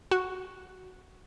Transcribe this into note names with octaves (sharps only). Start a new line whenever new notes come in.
F#4